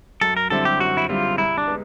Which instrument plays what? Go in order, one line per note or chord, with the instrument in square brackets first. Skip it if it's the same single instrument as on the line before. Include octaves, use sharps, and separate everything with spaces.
[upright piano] F#2 [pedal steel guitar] A4
[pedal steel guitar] A#4
[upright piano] D3 G3 C4 E4 [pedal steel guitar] A4
[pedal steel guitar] G4
[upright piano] F#2 [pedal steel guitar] F#4
[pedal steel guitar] E4
[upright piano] D3 G3 C4 E4 [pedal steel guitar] F4
[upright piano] C2 [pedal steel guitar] E4
[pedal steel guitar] D4
[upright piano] G#3 B3